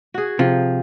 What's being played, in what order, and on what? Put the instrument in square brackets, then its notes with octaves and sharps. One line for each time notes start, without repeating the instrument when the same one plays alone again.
[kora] F#4 G#4
[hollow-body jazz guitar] C3 [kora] F3